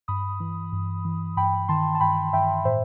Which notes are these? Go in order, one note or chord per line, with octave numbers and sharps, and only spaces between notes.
G2 B5 D#6
E3
G2
E3
G2 G5 B5
D#3 A5 C6
A5
G2 G5 B5
G2 E5 G5
A2 C5 E5